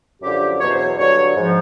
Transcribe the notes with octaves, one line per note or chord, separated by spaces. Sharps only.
F#2 D3 F3 G4
E2 B2 F#3 C#5
C5
C#5
G2 D3 F#3 C#5
G#2 F3